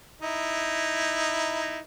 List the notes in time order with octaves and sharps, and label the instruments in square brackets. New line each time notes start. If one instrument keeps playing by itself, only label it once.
[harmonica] D#4 E4